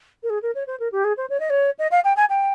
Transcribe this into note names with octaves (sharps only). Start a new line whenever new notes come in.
A#4
G#4
A#4
C#5
C5
A#4
G4
G#4
C5
C#5
D#5
C#5
D#5
F5
G5
G#5
G5